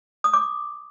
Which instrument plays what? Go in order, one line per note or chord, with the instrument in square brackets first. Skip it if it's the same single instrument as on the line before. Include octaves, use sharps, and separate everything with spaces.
[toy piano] D#6
D6